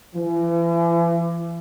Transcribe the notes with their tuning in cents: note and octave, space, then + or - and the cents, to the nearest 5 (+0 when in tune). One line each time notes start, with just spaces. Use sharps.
E3 +40